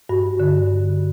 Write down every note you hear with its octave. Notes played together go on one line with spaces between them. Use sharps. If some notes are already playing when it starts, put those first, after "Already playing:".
G2 F#4
D3